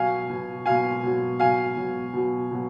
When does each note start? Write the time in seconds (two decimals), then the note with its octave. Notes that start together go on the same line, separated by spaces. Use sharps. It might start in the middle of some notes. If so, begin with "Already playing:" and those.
Already playing: B2 F#3 F5 G#5
0.30 B2 F#3
0.66 B2 F#3 F5 G#5
1.03 B2 F#3
1.39 B2 F#3 F5 G#5
1.77 B2 F#3
2.13 B2 F#3
2.51 B2 F#3